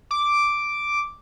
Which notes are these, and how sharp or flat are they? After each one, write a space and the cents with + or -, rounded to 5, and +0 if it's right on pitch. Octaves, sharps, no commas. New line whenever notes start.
D6 +0